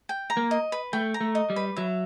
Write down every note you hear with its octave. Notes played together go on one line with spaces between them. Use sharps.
G5
A#5
A#3
D#5
B4
A3 G5
A#5
A3
D#5
G3
B4
F#3 E5